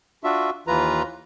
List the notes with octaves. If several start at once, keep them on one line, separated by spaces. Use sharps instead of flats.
D4 F4 F#4 E5
D#2 E3 F4 B4 A#5